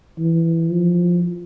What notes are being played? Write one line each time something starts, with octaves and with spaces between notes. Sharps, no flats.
E3
F3